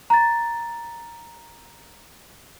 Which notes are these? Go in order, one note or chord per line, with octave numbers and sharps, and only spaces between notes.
A#5 A6